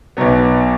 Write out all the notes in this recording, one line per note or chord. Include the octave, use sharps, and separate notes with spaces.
B1 B2 F#3 B3